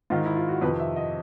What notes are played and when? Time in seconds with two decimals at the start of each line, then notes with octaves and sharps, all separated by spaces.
0.10 G#2 D#3 F4
0.26 E4
0.36 F4
0.49 F#4
0.61 F2 C3 D#3 B4
0.80 E5
0.96 D#5